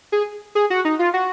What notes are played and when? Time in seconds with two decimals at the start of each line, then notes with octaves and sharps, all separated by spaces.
0.12 G#4
0.55 G#4
0.70 F#4
0.85 D#4
0.99 F4
1.14 F#4